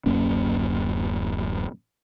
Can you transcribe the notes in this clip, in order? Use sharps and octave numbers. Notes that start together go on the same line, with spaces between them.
D1 F#2 A#3 C#4